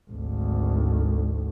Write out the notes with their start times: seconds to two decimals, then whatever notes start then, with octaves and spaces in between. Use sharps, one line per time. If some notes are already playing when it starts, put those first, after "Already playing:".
0.10 G#1 D2